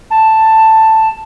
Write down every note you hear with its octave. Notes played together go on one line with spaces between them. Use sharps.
A5